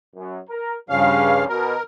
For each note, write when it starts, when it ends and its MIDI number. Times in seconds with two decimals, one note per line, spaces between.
0.15 0.37 42
0.48 0.74 70
0.90 1.45 43
0.90 1.45 49
0.90 1.47 53
0.90 1.47 55
0.90 1.47 61
0.90 1.45 77
1.49 1.74 47
1.49 1.83 70